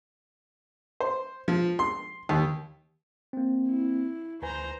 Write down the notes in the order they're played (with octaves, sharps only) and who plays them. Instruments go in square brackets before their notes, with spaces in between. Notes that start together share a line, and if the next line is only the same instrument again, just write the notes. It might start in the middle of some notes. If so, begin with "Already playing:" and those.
[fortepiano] C5
F3
C6
D#2
[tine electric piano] A#3 C4
[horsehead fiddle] E4
[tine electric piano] D2 B4 G#5 [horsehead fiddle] C5 A#5